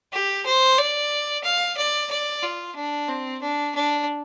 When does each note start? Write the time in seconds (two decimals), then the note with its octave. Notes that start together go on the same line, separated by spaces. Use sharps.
0.13 G4
0.46 C5
0.78 D5
1.44 F5
1.77 D5
2.11 D5
2.43 F4
2.76 D4
3.08 C4
3.42 D4
3.75 D4